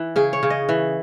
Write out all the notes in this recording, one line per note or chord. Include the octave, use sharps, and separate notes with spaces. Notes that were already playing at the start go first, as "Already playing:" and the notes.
Already playing: E3
C#3 G#4
C#5
C#3
D#5
E3